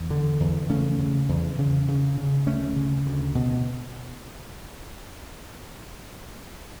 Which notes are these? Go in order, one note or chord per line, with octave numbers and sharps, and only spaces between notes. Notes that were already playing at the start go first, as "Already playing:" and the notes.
Already playing: E2
D3
E2
C#3 A3 C#4
C#3
E2
C#3
C#3
C#3
D2 A3 C#4
C#3
D2
B2